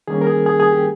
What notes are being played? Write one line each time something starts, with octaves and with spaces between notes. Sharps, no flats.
D#3 G3 A#3 C#4 G#4
A#4
G#4
G#4
G#4
G4